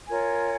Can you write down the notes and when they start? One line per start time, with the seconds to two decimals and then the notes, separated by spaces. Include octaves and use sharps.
0.07 F4 A#4 C#5 G#5